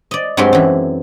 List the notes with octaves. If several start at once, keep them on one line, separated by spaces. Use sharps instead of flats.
D5 D#5
G2 F#3 G#3 C4 G4 C6
F#2 E3